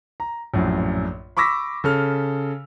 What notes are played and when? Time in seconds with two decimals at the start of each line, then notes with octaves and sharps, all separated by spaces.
0.20 A#5
0.54 A#1 F#2 A2
1.37 B5 C#6 D6 E6 A#6 B6
1.84 C#3 A4 F6